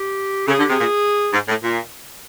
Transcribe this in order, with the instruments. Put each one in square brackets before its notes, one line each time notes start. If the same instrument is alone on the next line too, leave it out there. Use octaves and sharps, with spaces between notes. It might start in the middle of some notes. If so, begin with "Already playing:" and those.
Already playing: [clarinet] G4
[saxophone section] C#3 [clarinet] A4
[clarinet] G#4
[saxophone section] D3
[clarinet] G4
[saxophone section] C3 [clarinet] G#4
[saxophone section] A#2
G#2
A2
A#2